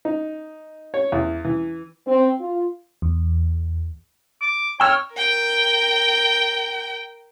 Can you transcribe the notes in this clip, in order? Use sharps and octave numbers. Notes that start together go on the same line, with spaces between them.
D#4
C#5
E2
E3
C4
F4
E2
D6
C#5 G5 E6 F6
A#4 G5